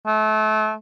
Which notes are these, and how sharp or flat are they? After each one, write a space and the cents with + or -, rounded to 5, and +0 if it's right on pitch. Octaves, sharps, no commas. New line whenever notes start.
A3 -30